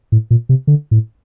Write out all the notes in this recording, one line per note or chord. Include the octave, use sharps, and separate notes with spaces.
A2
A#2
C3
D3
A2